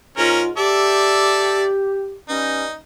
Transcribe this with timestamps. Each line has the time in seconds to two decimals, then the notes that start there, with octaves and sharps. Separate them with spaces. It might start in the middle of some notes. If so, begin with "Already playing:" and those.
0.17 G#2 C#4 F4 A#4
0.58 G4 A4 D5 E5
2.29 G3 B3 C#4 D#4